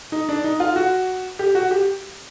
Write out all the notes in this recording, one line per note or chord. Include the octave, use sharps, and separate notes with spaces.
D#4
D4
D#4
F4
F#4
G4
F#4
G4